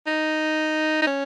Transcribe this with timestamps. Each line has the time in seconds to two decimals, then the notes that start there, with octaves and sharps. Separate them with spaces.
0.07 D#4
1.02 D#4
1.07 C#4